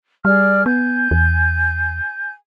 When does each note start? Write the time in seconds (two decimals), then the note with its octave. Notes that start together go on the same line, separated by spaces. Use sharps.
0.25 G3 G#4 D5 F6
0.66 B3 G#5 G6
1.11 E2